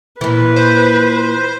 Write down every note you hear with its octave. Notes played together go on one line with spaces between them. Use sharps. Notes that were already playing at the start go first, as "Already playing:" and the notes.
A#2 E3 B4
C5